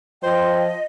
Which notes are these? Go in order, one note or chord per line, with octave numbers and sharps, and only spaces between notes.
F3 C5 D#5 G5